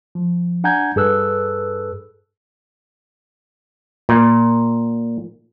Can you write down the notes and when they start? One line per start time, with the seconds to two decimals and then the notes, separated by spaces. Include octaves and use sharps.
0.15 F3
0.64 D4 F#5 G#5 A#5 G6 G#6
0.96 G2 G#4 A4 B4 E6 F#6
4.09 A#2